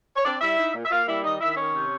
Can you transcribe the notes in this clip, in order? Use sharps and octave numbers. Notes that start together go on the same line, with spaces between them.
C#5
C4 D4 D5
G3 E4 E5
D#4
A#2
E5
A#3 F4 F5
G3 E4 E5
D#3 D#4 D#5
D#3 E4 E5
D#3 C#4 C#5
C3